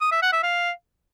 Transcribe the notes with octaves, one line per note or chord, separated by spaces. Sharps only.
D#6
E5
F#5
E5
F5